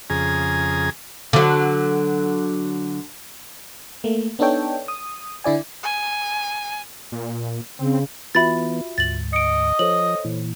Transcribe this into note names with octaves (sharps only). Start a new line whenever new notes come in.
F2 C#3 G#4 G#5 A#5
D3 F#3
A3 A#3
B3 D4 D#4 A4 C#5 G5
D#6
D3 E4 D5 G#5
G#5
A#2
C#3 C4
E3 B3 F4 F#4 E5 B5 A6
D2 G#2 A6 F#7
D#5 C#7 D7
F3 A4 C5 C#5 F#7
A#2 E3